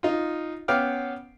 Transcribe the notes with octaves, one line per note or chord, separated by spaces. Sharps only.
D#4 F4
B3 C#4 F5 G5 D6 F6